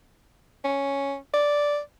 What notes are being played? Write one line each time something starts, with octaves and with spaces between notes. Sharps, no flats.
C#4
D5